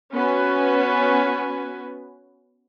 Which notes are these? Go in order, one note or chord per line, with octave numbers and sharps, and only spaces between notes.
B3 C#4 F#4 B4 G#5